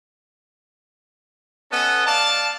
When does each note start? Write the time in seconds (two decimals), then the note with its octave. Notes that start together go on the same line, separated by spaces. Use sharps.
1.71 B3 C#4 A4 D#5
2.06 D5 F5 A5